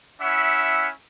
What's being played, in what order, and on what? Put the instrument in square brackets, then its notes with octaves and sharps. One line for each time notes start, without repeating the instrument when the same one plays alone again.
[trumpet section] C#4 E4 E5 F#5